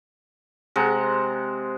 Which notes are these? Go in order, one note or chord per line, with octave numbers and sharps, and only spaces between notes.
C3 G#3 F#5 A#5